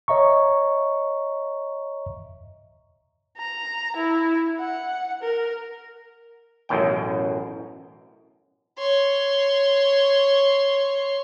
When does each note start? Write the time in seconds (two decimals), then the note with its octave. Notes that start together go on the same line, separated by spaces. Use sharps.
0.08 C#5 D#5 E5 A#5 C#6
3.38 A#5
3.97 E4
4.60 F#5
5.22 A#4
6.69 A1 F#2 B2 G5
8.78 C#5 C6